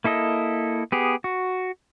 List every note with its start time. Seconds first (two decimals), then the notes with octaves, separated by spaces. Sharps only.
0.04 A#3 E4 A4 D#5
0.92 B3 G4 G#4
1.24 F#4